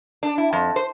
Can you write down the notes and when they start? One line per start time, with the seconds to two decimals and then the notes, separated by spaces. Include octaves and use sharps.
0.23 D4
0.38 E4
0.53 F2
0.76 C5